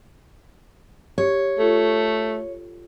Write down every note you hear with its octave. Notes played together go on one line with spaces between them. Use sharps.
G4 C#5
A3 F4 A4